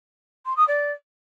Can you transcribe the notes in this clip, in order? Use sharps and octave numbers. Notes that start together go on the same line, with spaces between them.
C6
D#6
D5